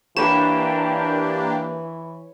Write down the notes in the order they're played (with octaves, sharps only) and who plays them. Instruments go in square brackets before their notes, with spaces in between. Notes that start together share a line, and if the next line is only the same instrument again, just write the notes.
[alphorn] E3 [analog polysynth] A#3 D4 G4 [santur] C#5 B5 [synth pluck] E7